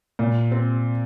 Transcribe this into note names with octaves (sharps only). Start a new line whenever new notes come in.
A#2
C4